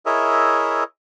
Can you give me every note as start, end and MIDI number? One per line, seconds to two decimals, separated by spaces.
0.06 0.84 64
0.06 0.84 68
0.06 0.84 70
0.06 0.84 73
0.06 0.84 75
0.06 0.84 76